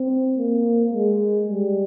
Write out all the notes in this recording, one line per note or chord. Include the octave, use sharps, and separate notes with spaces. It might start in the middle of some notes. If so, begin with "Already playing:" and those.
Already playing: C4
A#3
G#3
G3